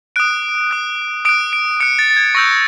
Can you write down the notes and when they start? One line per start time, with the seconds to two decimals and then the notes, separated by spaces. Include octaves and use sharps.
0.16 D#6 F#6 D7
0.71 D#6 F#6
1.25 D#6 F#6 D7
1.53 D7
1.80 D#6 F#6 C#7
1.99 A6
2.10 A6
2.16 G#6
2.35 C#6 E6 G6 A#6